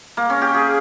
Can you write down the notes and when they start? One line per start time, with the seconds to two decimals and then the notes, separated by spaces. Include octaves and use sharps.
0.17 A#3
0.30 C#4
0.42 G4
0.54 G#4